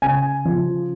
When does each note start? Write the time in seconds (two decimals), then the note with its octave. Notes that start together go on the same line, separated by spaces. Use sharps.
0.02 C#3 G#5
0.45 F3